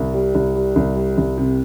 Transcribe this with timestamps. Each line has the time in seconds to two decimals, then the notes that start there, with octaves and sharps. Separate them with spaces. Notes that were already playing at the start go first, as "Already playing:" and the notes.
Already playing: C2
0.14 G3
0.35 C2
0.55 G3
0.76 C2
0.96 G3
1.18 C2
1.38 C3